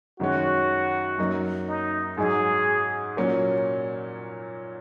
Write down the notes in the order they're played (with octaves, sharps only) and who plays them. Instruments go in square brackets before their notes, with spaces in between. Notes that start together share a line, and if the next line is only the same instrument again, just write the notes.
[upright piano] F#2 D#3 G#3 C#4 [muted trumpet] F#4
[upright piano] F#2 F#3 A#3 D#4
[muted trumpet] D#4
[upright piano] G#2 F#3 D#4 [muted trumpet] G#4
[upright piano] A#2 F#3 A#3 C#4